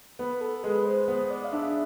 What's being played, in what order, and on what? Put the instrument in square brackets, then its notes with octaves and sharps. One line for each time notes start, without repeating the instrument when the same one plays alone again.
[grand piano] B3 [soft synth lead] B4
[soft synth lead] A4
[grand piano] G#3 [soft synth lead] B4
[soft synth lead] C5
[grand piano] B3 [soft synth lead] C5
[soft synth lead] D5
F5
[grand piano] D4 [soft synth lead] E5